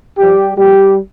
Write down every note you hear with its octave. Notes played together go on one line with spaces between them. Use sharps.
G2 F3 G3 G4
A#2 F3 G3 G4